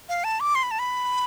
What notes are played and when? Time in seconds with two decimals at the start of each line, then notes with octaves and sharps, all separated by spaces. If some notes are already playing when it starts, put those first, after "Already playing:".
0.09 F5
0.24 A5
0.40 D6
0.55 C6
0.63 B5
0.71 A5
0.79 B5